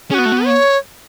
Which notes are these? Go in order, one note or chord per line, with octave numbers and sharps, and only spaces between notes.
C#4 G#4
B3 F#4
A3
B3
C#5